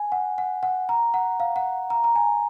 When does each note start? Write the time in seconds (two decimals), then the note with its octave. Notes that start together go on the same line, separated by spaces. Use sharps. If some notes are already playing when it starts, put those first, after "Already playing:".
Already playing: G#5
0.12 F#5
0.38 F#5
0.63 F#5
0.89 A#5
1.14 F#5
1.40 F5
1.56 F#5
1.90 A#5
2.04 A#5
2.15 G#5